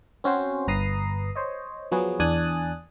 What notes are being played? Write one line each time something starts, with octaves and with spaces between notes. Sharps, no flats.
C4 C#4 F#4 C5
G1 B4 A#5 D#6 C7
C5 C#5 D#5
F3 F#3 B3 F#4 G#4
E2 D4 G#5 D#6 F#6 A6